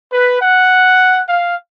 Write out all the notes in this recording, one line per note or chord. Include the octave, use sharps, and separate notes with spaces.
B4
F#5
F5